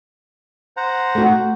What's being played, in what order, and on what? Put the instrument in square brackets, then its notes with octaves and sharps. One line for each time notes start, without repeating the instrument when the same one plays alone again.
[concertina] C5 F#5 A#5
[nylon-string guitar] A3 F#4